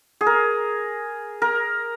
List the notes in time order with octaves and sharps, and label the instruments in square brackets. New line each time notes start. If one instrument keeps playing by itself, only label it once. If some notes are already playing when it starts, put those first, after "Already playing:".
[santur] G#4
A#4
A#4